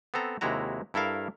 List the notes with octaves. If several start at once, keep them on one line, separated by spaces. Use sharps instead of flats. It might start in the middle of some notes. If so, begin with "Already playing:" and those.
B3 C4 A4 A#5
D#2 C3 G#3 E4 F#4 A#5
G2 E4 A4 A#4 F5